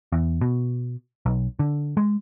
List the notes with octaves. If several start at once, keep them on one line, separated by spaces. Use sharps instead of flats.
E2
B2
B1
D3
G#3